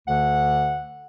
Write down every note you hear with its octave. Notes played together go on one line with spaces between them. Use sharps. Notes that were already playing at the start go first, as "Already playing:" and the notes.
D2 D3 F#5